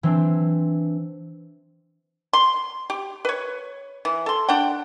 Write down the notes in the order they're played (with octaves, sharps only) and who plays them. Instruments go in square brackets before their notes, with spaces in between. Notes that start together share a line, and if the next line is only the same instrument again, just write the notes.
[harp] E3 C4 D4
[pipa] C6
G4
B4 C#5
E3
A4 C6
D4 F#5 G5